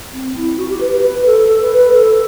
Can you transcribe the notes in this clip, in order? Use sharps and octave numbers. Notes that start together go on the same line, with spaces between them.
C4
E4
F#4
G4
B4
B4
B4
A4
A4
B4
B4
A4